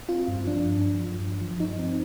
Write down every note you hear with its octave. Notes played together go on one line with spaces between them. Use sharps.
C4 F4
G2
F3 D4
G2
F3
F3
G2
F3
F3 D#4
C4